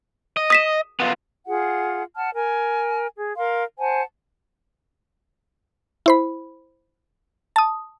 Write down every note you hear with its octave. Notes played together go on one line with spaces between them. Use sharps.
D#5
D#6 B6 E7
B3 F4
F4 G#4 F#5
F#5 A5 F6
A#4 G#5
G#4
A#4 F5 C6
C5 F#5 G#5 A5
E4 C5 B5
A5 D#6